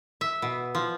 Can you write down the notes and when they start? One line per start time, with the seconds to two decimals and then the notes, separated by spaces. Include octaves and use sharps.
0.21 E5
0.42 B2
0.75 F3